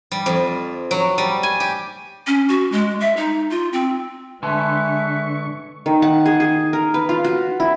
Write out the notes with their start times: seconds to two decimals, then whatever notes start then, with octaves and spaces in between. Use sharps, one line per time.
0.12 G3
0.26 F2
0.91 F#3
1.18 G3
1.43 G#5
1.60 G4
2.27 C#4
2.48 F#4
2.72 G#3
3.00 E5
3.17 D#4
3.50 F4
3.73 C4
4.43 D3 G#3 B4 E5 G#5 A5 C6 C#6
5.86 D#3
6.02 F#5
6.25 G#4
6.40 G#4
6.73 A#4
6.94 B4
7.09 F4
7.24 F#4
7.60 E4